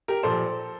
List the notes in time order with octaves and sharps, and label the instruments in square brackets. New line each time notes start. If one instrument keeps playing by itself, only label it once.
[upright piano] G4 A#4
A#2 F3 A4 C5